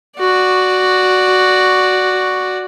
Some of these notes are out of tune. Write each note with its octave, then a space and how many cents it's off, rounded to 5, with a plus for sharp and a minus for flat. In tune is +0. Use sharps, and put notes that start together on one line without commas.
F#4 +0 D5 +0